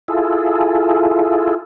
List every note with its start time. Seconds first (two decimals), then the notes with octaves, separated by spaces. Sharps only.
0.08 E4 F4 G#4 A4